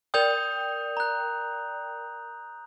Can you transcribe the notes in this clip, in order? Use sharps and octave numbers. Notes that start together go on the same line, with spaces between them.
A#4 D5 G5 D#6 G6 F7
A#5 F#6